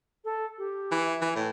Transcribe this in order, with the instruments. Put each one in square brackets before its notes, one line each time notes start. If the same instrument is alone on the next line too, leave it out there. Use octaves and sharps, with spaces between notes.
[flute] A4
G4
[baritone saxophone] E3
[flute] E5
[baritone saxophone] E3
[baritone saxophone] A2 [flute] B4